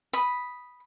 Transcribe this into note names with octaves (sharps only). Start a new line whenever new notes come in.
B5 D#6